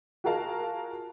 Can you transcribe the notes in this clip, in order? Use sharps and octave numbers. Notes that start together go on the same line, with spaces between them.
F4 F#4 G#4 A#4 F5 A5